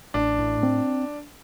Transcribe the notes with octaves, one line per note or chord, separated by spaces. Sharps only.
A1 D4
A2
C4